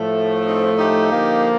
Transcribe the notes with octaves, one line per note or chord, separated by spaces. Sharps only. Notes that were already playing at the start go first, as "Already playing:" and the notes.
Already playing: A2 F3 A3
C4 D#4
D#4 G4
D3 F3 A#3